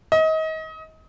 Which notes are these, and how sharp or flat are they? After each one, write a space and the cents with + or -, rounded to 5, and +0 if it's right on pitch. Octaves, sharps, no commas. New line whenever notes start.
D#5 +30